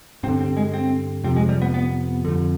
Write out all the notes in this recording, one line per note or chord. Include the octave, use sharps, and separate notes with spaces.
G2 D3 C4
C4
G#3
C4
F2 C3 C4
G#3
G3
B3
B3
F2 D3